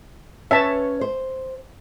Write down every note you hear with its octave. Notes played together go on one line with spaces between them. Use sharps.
C#4 B4 C#5 E5 A5
C5